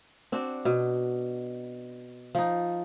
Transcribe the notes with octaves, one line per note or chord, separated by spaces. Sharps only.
C4 D4 F#4
B2
F3 D#4